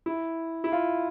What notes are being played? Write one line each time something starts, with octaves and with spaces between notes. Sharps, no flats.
E4
E4
F4